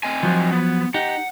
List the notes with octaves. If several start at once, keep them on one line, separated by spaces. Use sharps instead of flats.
C4 D#5 G#5
F3 F#3
B3
D#4 G4 F#5